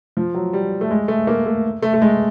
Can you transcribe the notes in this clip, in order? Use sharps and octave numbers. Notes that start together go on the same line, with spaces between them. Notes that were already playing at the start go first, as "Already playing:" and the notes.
F3
F#3
G3
A3
G#3
A3
A#3
A3
A3
A3
G#3